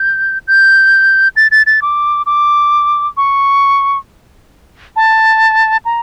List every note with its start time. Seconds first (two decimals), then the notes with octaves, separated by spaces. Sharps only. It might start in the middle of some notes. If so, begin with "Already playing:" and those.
Already playing: G6
0.48 G6
1.36 A6
1.51 A6
1.66 A6
1.82 D6
2.26 D6
3.17 C#6
4.96 A5
5.85 A#5